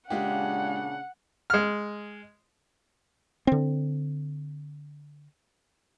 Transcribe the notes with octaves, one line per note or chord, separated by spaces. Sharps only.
A#2 C#3 G#3 D4 F4 G4 F#5
G#3 F6
D3 C4